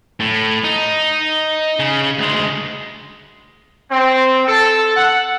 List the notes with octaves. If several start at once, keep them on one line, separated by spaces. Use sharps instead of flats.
A2
D#4
C#3
D2 G#3
C4
A4
F#5